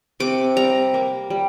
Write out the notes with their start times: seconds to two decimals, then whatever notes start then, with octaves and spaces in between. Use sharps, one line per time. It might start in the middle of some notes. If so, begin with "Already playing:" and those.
0.20 C3 D6
0.56 G3 A#5
0.94 A#3
1.30 G3